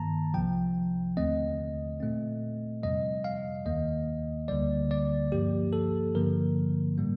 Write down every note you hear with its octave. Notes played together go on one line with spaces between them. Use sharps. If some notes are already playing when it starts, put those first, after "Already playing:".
Already playing: G2 D#3 A#3 A5 A#5
C2 C3 F3 G5
D#2 D3 A3 C4 D#5
A#2 A3 C4
F2 C3 G3 D#5
F5
D#2 D#3 A#3 D#5
D2 D3 G3 A#3 D5
D5
G2 F3 A#3 G4
A4
G2 D3 F3 A#3 A#4
A2 G3 A#3